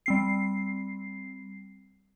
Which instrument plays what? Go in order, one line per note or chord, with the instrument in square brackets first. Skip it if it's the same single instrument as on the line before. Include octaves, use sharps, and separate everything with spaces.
[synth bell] G3 C4 C7